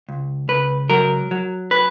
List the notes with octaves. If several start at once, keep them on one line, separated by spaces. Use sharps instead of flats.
C#2
C#2 B4
F#3 A#4
F#3
B4